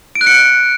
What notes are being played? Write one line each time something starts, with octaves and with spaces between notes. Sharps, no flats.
D7
F#6
C#7